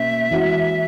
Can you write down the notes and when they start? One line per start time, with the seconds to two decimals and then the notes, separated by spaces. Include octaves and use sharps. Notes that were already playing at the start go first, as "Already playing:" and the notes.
Already playing: B2 A#3 C#4 E5
0.31 E3 G#3 C#4 F#4